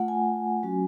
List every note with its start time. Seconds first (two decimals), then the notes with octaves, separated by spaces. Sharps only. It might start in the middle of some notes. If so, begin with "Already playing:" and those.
Already playing: A3 F4 F#5
0.08 G#5
0.63 F#3 C#4 F#4